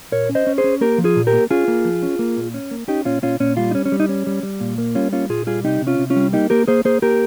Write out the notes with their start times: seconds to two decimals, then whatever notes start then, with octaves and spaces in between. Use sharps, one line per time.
0.12 A#2 A#4 C#5
0.29 C#4
0.35 C5 D#5
0.47 C#4
0.58 G#4 C5
0.64 C#4
0.81 A#3 G4 A#4
0.98 F3
1.04 F4 G#4
1.16 A#2
1.27 G4 A#4
1.33 A#3
1.51 C#4 F4 G#4
1.68 A#3
1.85 F3
2.03 C#4
2.19 A#3
2.37 A#2
2.54 C#4
2.71 A#3
2.88 C#4 D#4 G4
3.05 A#2 C#4 F4
3.22 A#2 C#4 F4
3.40 A#2 C#4
3.57 G3 F4
3.71 D#4
3.75 C#4
3.85 C#4
3.92 G3
4.00 D#4
4.09 C#4
4.27 G3
4.43 G3
4.60 A#2
4.78 A#3
4.95 G3 C#4 F4
5.12 A#3 C#4 F4
5.30 A#2 F4 G#4
5.47 G3 F4 G#4
5.64 C3 D#4 G4
5.82 C3
5.87 C#4 F4
5.99 C3
6.10 C#4 F4
6.16 G3
6.33 A#3 D#4 G4
6.50 A#3 G4 A#4
6.68 A#3 G#4 C5
6.85 A#3 G#4 C5
7.02 A#3 G4 A#4